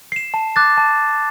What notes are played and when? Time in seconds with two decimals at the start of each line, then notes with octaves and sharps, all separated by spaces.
0.12 C7 E7
0.34 A5
0.56 D6 F#6 A6
0.78 A5